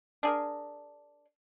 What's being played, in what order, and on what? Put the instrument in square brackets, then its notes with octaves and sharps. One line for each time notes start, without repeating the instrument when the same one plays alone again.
[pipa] D4 G#4 A#4